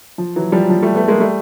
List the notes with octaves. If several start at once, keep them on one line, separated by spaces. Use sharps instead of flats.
F3
E3 F#3
F3 G3
F#3
F3
G3 A3
A3 B3
G#3 A#3
G3 A3